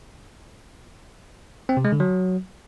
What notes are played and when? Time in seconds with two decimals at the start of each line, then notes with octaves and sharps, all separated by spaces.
1.69 C4
1.77 C3
1.85 G#3
1.92 D3
2.00 F#3